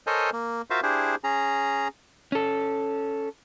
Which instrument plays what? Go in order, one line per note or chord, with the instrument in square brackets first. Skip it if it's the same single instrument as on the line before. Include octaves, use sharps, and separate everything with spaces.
[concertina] A4 A#4 C5 C#5 D#5 G#5
A#3
F4 F#4 A#4 C5 E5 F5
D4 E4 G4 G#4 C5
C#4 G#4 A#5
[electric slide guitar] C#4 A4